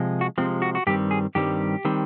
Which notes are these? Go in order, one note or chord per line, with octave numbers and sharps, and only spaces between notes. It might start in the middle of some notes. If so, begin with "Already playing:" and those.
Already playing: C3 F3 G#3
F#4
C3 F3 G#3 C4
F#4
F#4
G2 D#3 G3 C4 G4
G#4
G2 D#3 G3 C4 G4
D#3 G3 C4